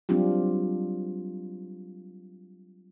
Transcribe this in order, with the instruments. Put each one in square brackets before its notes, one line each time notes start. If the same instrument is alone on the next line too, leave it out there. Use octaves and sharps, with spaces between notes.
[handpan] F#3 G3 C4 D4 F4 G4